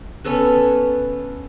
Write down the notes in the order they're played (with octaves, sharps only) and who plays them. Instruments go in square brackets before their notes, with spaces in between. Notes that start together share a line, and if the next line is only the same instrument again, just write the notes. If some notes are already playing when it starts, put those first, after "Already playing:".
[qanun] B3 C#4 A4 B4